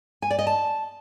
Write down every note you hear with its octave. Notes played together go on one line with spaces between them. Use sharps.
G#5
D5
D#5
A5